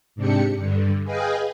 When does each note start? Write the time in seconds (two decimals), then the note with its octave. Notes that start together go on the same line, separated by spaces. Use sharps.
0.16 G#2 C3 D4 G4 C#7
0.55 G2 D3
1.04 G#4 B4 D#5 F5 G5 G#5